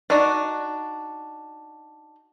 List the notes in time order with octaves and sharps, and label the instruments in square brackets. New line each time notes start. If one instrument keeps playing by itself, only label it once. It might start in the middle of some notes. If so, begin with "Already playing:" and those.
[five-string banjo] D4 D#4 F#4 D5